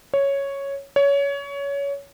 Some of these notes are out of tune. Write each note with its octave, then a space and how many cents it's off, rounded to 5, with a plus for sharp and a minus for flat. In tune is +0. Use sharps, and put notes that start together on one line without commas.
C#5 +0
C#5 +20